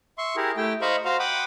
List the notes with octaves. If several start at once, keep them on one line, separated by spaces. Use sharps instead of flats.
E5 C6 C#6
E4 G4 G#4 A#4
A3 E4 G4 G5
C5 D#5 F5 A#5 B5 C#6
F#4 C5 F5 A#5 C6
F#5 G5 B5 D6 D#6